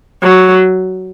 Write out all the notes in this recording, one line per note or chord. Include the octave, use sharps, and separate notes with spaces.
F#3